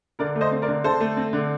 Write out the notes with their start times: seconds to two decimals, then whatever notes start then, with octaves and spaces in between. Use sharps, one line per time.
0.19 D3 A#4 D5
0.35 A3
0.41 C5 D#5
0.52 C4
0.62 A#4 D5
0.68 D3
0.84 D3 A4 C5
1.00 A3
1.17 C4
1.33 D3